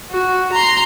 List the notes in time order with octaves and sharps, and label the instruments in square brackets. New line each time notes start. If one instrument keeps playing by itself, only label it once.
[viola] F#4
A#5 C6